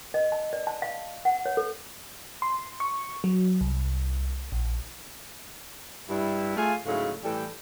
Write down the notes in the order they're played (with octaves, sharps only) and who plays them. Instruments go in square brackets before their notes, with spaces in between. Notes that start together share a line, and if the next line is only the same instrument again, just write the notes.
[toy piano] D#5
A5
D5
A5
F5
F#5
C#5
A4
[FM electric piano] C6
C#6
F#3
C2
A#1
[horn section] G2 G3 D4 E4
A3 F4 G#4 F5 G#5
G#2 C#3 F#3 A3 E4 F5
A2 E3 G3 A4 G5